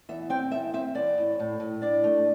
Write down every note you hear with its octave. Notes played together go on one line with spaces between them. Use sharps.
E2 E5
C4 G5
E2 E5
C4 E5
E2 D5
A2
A2
A2
D4 D5
A3